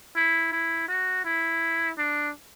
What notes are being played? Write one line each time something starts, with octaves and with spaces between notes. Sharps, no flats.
E4
E4
F#4
E4
D4